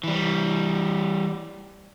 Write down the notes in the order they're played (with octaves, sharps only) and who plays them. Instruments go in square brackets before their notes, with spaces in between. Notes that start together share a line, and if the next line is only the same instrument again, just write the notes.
[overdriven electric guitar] E3 G3